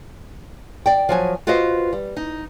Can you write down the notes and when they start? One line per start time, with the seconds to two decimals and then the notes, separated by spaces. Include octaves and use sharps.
0.86 D5 G5
1.09 F3 F#3 G#5
1.47 F4 F#4 B4 C5 D#5 F5
1.93 G3
2.17 D#4